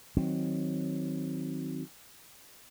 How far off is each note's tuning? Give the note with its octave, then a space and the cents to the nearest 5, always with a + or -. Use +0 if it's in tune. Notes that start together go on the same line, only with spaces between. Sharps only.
D#3 +10 F#3 +0 C4 +0